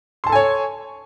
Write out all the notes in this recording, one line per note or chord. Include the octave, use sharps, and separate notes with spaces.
A4 C#5 G#5 A5 C6